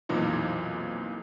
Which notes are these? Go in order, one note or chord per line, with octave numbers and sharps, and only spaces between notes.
B1 F2 A#2 E3 D#4